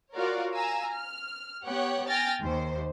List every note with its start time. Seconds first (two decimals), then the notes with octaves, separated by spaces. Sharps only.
0.16 F4 F#4 A#4 C#5 D5 F5
0.54 F5 G#5 A#5 E6
0.93 F6
1.66 B3 G4 C#5 F#5 G5
2.09 G5 G#5 F6 A6 A#6
2.41 D#2 C5